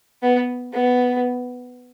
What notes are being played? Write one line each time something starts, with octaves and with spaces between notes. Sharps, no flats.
B3
B3